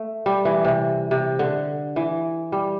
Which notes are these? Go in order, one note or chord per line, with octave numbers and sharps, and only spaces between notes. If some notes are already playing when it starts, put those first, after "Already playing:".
Already playing: A3
G3
E3
C3
C3
D3
E3
G3